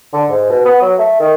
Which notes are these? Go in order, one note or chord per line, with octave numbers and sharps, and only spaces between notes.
D3
G#2
B2
B3
F#3
A3
D#3